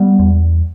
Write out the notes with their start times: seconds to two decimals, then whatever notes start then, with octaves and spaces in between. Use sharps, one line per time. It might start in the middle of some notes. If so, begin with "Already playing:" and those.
Already playing: G3 B3
0.19 E2